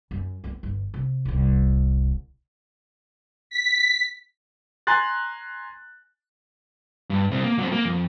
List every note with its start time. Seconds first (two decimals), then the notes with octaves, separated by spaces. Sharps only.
0.11 F#2
0.44 B3 C4
0.63 G1
0.94 C3
1.25 D1 C2
3.50 B6
4.87 G#5 A#5 C6 F#6 A6
7.10 G2
7.31 C2 C4
7.44 A#3
7.59 F#3 C4
7.72 A#3
7.86 F2